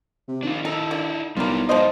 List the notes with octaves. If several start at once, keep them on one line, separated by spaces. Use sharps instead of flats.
C3
D#3 D4 F4
D#4 E4 A4
D3
B1 G3 A#3 C4 E4 F4
F3 G#3 D#4 F4 C5 D#5